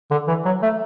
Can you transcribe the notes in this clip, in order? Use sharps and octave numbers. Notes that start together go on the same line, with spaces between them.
D3
E3
F#3
A3